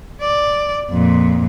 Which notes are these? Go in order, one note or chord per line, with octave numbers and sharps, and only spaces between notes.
D5
F2 A#2